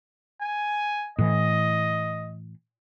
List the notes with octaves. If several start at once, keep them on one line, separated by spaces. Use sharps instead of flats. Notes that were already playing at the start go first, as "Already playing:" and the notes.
G#5
A2 E3 D#5